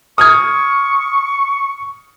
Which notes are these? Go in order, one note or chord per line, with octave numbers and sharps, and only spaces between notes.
C#6 D#6 F6 G#6